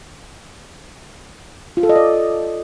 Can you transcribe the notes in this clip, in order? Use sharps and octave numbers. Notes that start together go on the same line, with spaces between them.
F4
A4
D#5
D5